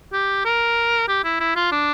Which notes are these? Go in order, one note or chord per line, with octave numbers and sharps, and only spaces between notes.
G4
A#4
G4
E4
E4
F4
D4